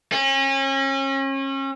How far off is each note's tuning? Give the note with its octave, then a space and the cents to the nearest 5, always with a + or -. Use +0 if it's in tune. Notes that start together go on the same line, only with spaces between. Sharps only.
C#4 -35